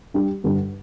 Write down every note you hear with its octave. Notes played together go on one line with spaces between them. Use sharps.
G3 D4 G4
G2 D3 G3